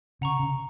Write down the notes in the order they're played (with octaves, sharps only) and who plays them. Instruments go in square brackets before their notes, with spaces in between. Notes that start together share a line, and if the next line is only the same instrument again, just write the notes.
[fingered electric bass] C#3 [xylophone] F#5 A#5 C#6
[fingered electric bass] C#3